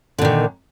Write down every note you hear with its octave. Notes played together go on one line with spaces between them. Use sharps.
A#2 D3 D#3